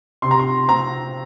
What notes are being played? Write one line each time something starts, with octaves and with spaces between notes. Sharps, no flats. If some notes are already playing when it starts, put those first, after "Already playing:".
C3 C6
A#5
C6
C4 A#5